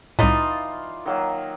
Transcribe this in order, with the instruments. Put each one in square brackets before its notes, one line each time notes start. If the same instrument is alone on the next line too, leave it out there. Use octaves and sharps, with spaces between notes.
[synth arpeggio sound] C2 A2 [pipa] E3 D#4 [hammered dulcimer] F4 D5
[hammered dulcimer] D#3 F#3 A#3